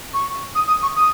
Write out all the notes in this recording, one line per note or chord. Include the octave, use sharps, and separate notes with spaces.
C#6
D#6
D#6
C#6
D#6